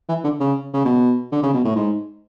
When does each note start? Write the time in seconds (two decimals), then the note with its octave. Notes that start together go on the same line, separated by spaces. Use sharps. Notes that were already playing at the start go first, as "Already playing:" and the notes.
0.09 E3
0.24 D3
0.40 C#3
0.73 C#3
0.85 B2
1.32 D3
1.43 C#3
1.54 B2
1.65 A2
1.76 G#2